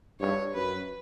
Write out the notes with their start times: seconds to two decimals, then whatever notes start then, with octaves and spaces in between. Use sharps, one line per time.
0.20 G2 C#5
0.54 F#2 B4